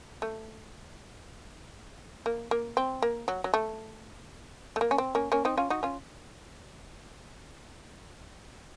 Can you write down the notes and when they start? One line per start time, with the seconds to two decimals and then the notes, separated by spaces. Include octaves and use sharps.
0.22 A3
2.26 A#3
2.51 A#3
2.77 C4
3.02 A#3
3.28 F#3
3.44 F#3
3.54 A3
4.76 A3
4.81 A#3
4.91 C#4
4.98 C4
5.15 A#3 C#4
5.32 A#3 C#4
5.45 C4 D#4
5.57 C#4 F4
5.70 D#4 F#4
5.83 C#4 F4